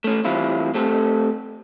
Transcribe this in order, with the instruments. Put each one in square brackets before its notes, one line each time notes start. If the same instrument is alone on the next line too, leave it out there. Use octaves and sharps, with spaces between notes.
[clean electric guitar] A3 C#4
A2 E3 G3 C4 E4 F4
A3 C4 G4 A4